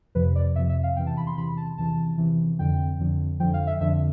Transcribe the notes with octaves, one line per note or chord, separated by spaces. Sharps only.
F2 C3 F3 B4
D5
F2 C3 F3 E5
E5
F5
E2 C3 E3 G5
A5
B5
C6
E2 C3 E3 B5
A5
E2 C3 E3 A5
E2 C3 E3
F2 D3 F3 G5
F2 D3 F3
F2 D3 F3 G5
F5
E5
F2 D3 F3 E5